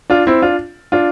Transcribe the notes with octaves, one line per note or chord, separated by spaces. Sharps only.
D4 F4
C4 E4
D4 F4
D4 F4